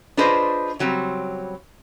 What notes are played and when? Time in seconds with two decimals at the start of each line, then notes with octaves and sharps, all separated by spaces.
0.17 D4 F4 G#4 B4 C5 D#5
0.79 C#3 F#3 G3 C4